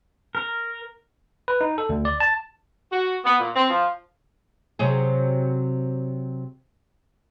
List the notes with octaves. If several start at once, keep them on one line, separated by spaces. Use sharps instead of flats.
A#4
B4
D#4
A4
D2
D5
A5
F#4
B3
A#2
C4
F3
C3 F#3 G#4